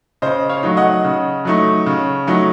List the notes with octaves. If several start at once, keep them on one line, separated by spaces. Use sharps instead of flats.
C#3 C5 D#5
C#5 F5
F#3 A3 D#4
D#5 F#5
C#3
F#3 A3 D#4
C#3
F#3 A3 D#4